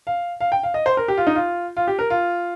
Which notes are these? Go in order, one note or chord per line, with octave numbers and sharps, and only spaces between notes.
F5
F5
G5
F5
D#5
C5
A#4
G4
F4
D#4
F4
F4
G4
A#4
F4